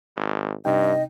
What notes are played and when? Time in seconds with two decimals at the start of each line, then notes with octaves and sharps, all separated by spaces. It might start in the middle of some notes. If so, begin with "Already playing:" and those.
0.17 G#1
0.65 G2 C3 D#4 D#5 G5